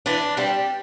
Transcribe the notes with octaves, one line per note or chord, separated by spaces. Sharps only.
E3 D4
G3 C4 G4